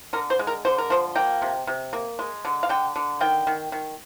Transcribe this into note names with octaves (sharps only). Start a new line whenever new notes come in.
D3 A#4
C5
G#3
A#4
D3 C5
A#4
F3 C5
A#3 G5
C3
C3
A#3
G#3
D3
F5
D3 G5
D3
D#3 G5
D#3
D#3